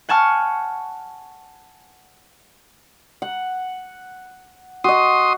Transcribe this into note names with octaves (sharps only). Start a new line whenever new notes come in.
F#5 G#5 A5 C#6 F6
F#5
F#4 D#5 C6 D#6